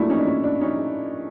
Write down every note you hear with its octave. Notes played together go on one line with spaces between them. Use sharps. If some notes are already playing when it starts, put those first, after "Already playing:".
Already playing: A#2 F#3 A3 D4 E4
C#4 D#4
D4
C#4
D4
C#4 D#4